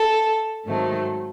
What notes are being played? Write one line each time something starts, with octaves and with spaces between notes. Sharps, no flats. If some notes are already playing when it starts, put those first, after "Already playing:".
Already playing: A4
G#2 D#3 F#3 A3 C4